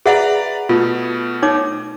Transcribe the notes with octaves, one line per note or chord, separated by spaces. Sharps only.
G#4 B4 D5 E5 F#5 A#5
B2 A3 B3 F4
D#4 C#5 D6